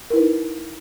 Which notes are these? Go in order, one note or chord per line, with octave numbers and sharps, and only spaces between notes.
D#4 E4 A#4 B4